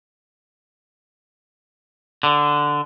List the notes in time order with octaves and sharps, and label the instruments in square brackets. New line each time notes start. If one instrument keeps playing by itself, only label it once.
[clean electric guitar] D3